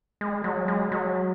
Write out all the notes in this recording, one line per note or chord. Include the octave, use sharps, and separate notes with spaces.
G#3
F#3
G#3
F#3